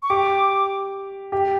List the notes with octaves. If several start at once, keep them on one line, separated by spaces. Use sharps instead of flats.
C#6
G4 D6
G4